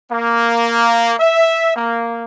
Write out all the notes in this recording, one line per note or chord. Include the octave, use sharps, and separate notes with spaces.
A#3
E5
A#3